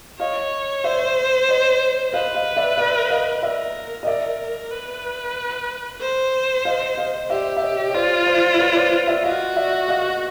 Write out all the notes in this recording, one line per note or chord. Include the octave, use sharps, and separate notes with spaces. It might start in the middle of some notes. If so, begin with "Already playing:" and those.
C#5 D#5 F5
C5 D5 E5
C#5 D#5
B4 D#5 F5
D#5 F5
D5 E5
D5 E5
D#5 F5
A#4 D5 E5
D#5
A#4 D5 E5
B4
C5
D#5 F5
D#5 F5
G4 D5 E5
E5
C#5 D#5
C#5
F4 C5 D5
C5 D5
D5
B4 C#5
C5 D5
D5 E5
F#4 D#5 F5
D5 E5
D#5 F5